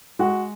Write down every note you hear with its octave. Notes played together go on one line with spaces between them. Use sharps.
G#3 F#4